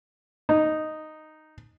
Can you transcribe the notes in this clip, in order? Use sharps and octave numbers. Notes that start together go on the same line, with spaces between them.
D#4